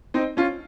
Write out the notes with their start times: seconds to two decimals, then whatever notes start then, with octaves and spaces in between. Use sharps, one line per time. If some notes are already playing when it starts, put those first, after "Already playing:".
0.14 C4 D#4
0.37 C#4 F4